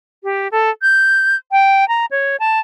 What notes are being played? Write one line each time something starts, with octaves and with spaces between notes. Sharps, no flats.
G4
A4
G6
G5
A#5
C#5
A5